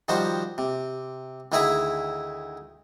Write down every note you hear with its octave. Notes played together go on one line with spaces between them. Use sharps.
D#3 F3 G3 F#4 C5
C3
D2 D#3 E4 G#4 E5 D#6